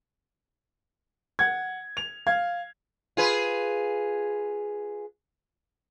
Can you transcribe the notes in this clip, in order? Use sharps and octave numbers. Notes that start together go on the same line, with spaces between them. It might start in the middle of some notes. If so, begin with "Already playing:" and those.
F#5 G#6
F7
F5 G#6
F4 G#4 B4